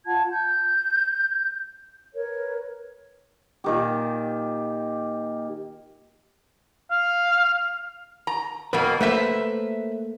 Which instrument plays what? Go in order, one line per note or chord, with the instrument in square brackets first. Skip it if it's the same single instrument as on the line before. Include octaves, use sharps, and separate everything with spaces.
[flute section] F4 F#5 A5 G#6
G6
A#4 B4 C#5
[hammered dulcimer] A#2 D#3 G4
[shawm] F5
[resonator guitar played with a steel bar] A#5
[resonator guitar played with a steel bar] F2 B2 A#3 [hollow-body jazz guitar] B4
[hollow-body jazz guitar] A3 A#3 [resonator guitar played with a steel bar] B4 C5 E5